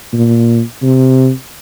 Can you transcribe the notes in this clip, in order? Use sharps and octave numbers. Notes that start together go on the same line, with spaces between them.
A#2
C3